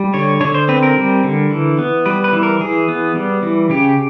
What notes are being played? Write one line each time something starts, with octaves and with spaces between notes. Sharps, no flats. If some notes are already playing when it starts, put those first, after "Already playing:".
Already playing: G3
D3 C#5
D3 C#5
C5
C4 B4
A#4
G3
D3
E3
B3
G3 B4
B4
E3
A#4
E3 G#4
B3
G3
E3
C#3 G4